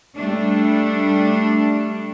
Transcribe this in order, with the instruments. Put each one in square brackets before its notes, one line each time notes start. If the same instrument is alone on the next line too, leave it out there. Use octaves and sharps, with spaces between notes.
[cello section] G3 A3 D4